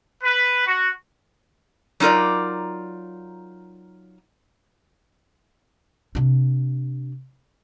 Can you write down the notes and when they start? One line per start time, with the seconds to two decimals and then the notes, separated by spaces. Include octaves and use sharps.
0.23 B4
0.67 F#4
2.00 F#3 D#4 F4 A#4 D5
6.15 C3 D4